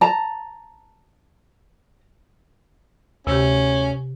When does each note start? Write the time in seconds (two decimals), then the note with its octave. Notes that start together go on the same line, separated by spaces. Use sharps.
0.01 A5 A#5
3.27 D2 C3 C#4 G4